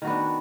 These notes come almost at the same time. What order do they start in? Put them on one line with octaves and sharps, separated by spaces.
D#3 F#4 B3 D4